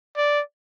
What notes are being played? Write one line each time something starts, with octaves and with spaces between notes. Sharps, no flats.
D5